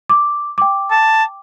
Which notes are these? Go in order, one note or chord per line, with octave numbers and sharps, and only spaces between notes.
D6
G5 D6
A5